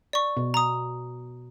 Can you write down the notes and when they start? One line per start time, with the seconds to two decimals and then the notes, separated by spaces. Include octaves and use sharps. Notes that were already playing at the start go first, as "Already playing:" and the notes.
0.13 D5 C#6
0.37 B2
0.54 A#5 D#6